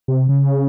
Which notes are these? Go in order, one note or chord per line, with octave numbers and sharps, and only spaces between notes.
C3
C#3